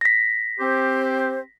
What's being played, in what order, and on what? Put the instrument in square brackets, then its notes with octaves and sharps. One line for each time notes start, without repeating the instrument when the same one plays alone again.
[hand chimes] A#6 B6
[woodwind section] C4 G4 C5